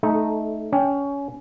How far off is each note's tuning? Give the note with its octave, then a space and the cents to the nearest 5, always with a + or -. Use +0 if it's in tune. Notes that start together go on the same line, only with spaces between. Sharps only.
A3 -10 D#4 +0 A4 -35
C#4 +20 G5 +15